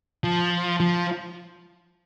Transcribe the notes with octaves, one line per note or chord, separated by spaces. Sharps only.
F3
F3